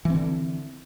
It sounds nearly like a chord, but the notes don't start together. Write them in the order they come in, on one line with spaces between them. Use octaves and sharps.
E3 C4 D3